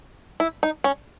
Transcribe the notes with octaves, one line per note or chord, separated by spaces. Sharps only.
E4
D#4
C#4